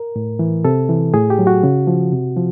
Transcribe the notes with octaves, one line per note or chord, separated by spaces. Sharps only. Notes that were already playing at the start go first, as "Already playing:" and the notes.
Already playing: A#4
A2
E3
C3 A4
E3
A2 G#4
G4
F#3
F#4
C#3
F3
C3
F3